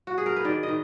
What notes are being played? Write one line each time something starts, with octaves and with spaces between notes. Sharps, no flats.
F#4
G#4
A#4
B4
D#3 D5
D#5
D#3